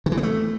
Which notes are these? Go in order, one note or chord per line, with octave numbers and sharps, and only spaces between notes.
D#3
E3
B3
A3